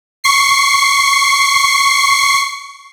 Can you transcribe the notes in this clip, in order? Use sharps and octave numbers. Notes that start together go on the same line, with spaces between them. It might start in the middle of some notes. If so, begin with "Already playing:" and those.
C#6 C7